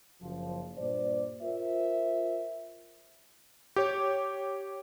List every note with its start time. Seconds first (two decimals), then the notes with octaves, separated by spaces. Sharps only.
0.22 F#1 F3
0.78 G2 A#2 C5 D5
1.43 F4 A#4 C5 E5
3.76 G4 C#5